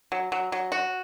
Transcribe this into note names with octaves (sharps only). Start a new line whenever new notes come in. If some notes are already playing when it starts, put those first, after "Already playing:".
F#3
F#3
F#3
F#4